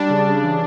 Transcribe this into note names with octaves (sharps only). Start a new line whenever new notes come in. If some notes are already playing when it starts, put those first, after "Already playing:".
Already playing: G3 D4
C#3
C#3
E3